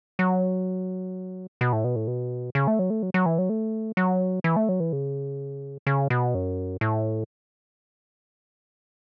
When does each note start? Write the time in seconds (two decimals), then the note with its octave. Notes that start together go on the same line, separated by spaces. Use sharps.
0.19 F#3
1.61 B2
1.73 A2
1.84 B2
1.96 A2
2.07 B2
2.55 C#3
2.67 A3
2.79 F#3
2.90 A3
3.03 F#3
3.14 F#3
3.26 E3
3.38 F#3
3.49 A3
3.97 F#3
4.44 E3
4.56 A3
4.69 F#3
4.80 E3
4.93 C#3
5.87 C#3
6.10 B2
6.34 F#2
6.81 A2